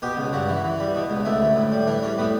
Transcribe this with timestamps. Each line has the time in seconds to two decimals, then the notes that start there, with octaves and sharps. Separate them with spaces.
0.02 B2 G4
0.17 C#2
0.33 G2 F#4
0.49 E3
0.64 E3
0.79 G3
0.95 B2
1.10 C#2
1.25 D2 E4
1.42 D2
1.56 A2
1.72 G3
1.87 E3 D4
2.02 G3 C#4
2.18 A2 B3